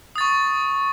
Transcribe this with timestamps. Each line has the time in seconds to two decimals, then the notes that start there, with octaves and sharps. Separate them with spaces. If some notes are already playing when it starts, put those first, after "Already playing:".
0.16 D#6
0.18 A6
0.21 C#6